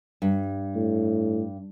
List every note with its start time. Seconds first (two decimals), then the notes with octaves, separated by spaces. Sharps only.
0.22 G2
0.75 A2